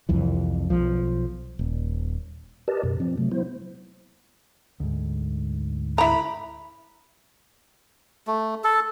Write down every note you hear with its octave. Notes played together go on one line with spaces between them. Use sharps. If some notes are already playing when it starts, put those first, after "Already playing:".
C2 F2 E3
B1 F3
D#1
G4 A#4 B4 D5 D#5 A5
F#2 B2
F3 C4
C3 F#3 A3
F#3 B3 E4 C5
D2 G#2
E4 A#5 B5
A3
A4